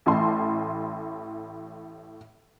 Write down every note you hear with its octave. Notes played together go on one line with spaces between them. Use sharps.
A1 A2 A5 C6